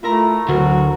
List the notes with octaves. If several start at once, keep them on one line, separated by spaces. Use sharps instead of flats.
A3 E4 F4 A#4 A#5
D2 F#3 F#4 A#4